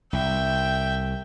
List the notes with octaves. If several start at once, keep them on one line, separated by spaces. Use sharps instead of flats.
C2 E5 G5